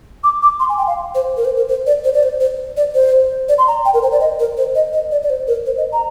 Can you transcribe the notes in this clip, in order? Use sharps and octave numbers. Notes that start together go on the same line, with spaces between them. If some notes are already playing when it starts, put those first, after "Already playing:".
D6
D6
C6
G#5
G5
F5
C5
A#4
C5
A#4
C5
D5
C5
D5
C5
C5
D5
C5
D5
C6
A#5
G5
A#4
C5
D5
D#5
A#4
C5
D#5
D#5
D5
D5
C5
A#4
C5
D#5
A#5